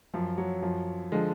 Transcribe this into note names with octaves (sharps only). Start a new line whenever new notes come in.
F#2 F3
F#3
F#2 F3
D3 F3 G#3